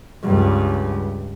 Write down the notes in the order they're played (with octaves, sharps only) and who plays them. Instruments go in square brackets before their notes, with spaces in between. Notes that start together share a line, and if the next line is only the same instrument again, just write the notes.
[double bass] C#2 G2